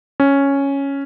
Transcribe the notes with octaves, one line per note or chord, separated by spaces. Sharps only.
C#4